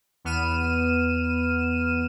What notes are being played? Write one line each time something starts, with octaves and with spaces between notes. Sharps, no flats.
E2 B3 F6 D#7 E7